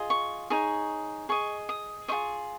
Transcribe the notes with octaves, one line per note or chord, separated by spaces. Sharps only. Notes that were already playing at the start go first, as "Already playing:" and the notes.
Already playing: F4 G#4 D#5
C#6
D#4 G#4 C#5
G#4 D#5 C#6
D#6
F4 G#4 C5 D#5 C#6